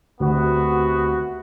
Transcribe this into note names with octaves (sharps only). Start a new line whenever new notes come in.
D2 C3 B3 F#4